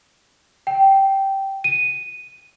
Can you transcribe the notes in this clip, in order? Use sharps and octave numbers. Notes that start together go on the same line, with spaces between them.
G5
D#7